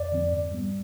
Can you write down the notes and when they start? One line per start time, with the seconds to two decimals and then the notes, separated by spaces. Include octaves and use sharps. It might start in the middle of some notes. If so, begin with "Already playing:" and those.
Already playing: F2 D5
0.12 D3 F3 C4
0.32 G#2
0.52 G3 B3